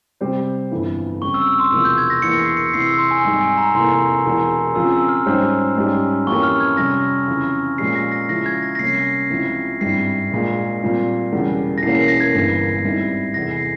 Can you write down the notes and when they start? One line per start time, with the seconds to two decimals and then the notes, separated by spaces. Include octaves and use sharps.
0.21 C3 G3 C4 G4 C5
0.71 G1 F2 E3
1.21 C#3 G3 C4 C#6
1.34 E6
1.47 E6
1.60 C6
1.72 E1 E2 C3 F3 E6
1.85 G6
1.98 G#6
2.10 A#6
2.22 E1 E2 E3 A#3 C#7
2.39 C7
2.57 C#7
2.74 E2 C3 E3 C7
2.86 E6
2.98 C6
3.11 G#5
3.24 G#1 G#2 G3
3.41 G#5
3.57 A#5
3.74 F1 E2 E3 A#3 C6
4.25 E1 E2 E3
4.75 C#3 F3 C4 F4 G#4 E6
4.92 E6
5.09 F6
5.26 G#2 G3 C#4 G4 C5
5.77 G#2 G3 C#4 G4
6.27 F2 E3 A#3 C#4 G4 C#6
6.43 F6
6.60 G#6
6.77 F2 C3 G3 C#4 A#6
7.28 F2 C#3 E3
7.78 A#2 F3 G#3 C#4 G4 C7
7.95 A#6
8.12 A#6
8.29 C#3 F3 G#3 E4 A#6
8.46 G#6
8.62 A#6
8.75 A#6
8.79 C3 G3 A#3 C#4 C7
9.30 C#2 C#3 F3 C4 E4
9.81 G#1 G2 G3 C4 E4 C7
10.31 A#1 A#2 G#3
10.82 A#2 G3 C4 F4
11.32 E1 E2 C#3 G3
11.78 A#6
11.83 E1 E2 E3 A#3 C#4 C7
11.95 C7
12.08 A#6
12.21 G#6
12.33 G1 G2 E3 A#3
12.84 G#2 G3 C4 E4
13.34 F1 E2 E3 A#6
13.51 C7